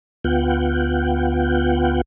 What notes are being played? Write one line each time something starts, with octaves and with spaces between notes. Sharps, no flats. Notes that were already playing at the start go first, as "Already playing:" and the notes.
D2 B3 F4 F#5 G5